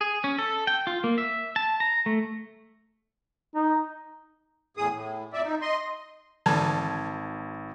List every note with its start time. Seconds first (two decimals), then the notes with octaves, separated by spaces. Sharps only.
0.01 G#4
0.24 C#4
0.39 A4
0.67 G5
0.87 F4
1.04 A#3
1.18 E5
1.56 A5
1.80 A#5
2.06 A3
3.55 D#4
4.77 E2 A2 G#4 D#6
4.91 A2
5.33 F2 D5 E5
5.44 D#4
5.61 D#5 C6
6.46 G#1 D3 E3 G3 A5 G#6